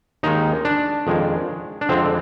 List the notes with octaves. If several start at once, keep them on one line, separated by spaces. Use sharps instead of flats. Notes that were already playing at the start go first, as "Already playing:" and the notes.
D#2 D#3 G#3 D#4
D4
F2 D#3 G#3
D4
F2 D3 G#3 C4